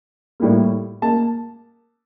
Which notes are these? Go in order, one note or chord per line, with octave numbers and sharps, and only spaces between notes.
A2 G3 A#3
A#3 A5